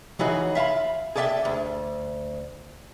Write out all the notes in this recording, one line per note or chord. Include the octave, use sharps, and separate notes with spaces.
C#3 E3 D#4 F#4 G#4
E5 F5 A5 B5
G#4 A4 D5 E5 F5 G5
D2